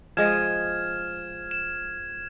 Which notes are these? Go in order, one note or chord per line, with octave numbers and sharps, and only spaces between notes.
F3 G#3 D#5 F6 G#6 E7
E7